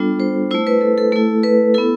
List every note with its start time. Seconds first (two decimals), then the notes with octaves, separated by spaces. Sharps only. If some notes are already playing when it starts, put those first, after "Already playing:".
Already playing: G3 B3 D4 F4 A4
0.20 C5
0.51 A3 E4 C5
0.67 B4
0.81 A4
0.98 A4
1.12 A3 E4 A4
1.43 B4
1.74 B3 E4 A4